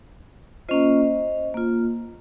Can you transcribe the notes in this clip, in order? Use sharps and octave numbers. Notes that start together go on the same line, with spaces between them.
A#3 C#4 F4 C5 D#5
A#3 F4